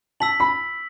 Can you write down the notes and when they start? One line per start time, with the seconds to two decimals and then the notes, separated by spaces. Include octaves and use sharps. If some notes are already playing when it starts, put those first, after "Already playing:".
0.20 A5 E6 B6 F#7
0.40 B5